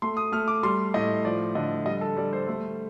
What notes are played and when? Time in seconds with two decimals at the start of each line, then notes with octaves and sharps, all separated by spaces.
0.02 A3 C6
0.17 D#6
0.32 A3 F6
0.48 D6
0.63 G3 C6
0.94 A2 D#5
1.25 F3 D5
1.55 D3 D#5
1.86 G3 D#5
2.01 A4
2.17 G3 D5
2.33 C5
2.48 A3